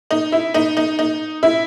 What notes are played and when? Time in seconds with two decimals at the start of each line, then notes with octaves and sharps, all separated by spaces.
0.11 D#4
0.32 E4
0.54 D#4
0.77 D#4
0.99 D#4
1.43 E4